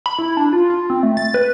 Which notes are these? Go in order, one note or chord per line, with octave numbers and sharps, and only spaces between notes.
B5
E4
D4
F4
F4
C4
A3
A6
B4